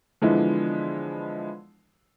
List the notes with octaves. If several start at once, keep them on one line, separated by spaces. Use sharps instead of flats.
D3 E3 F3 G#3 B3 E4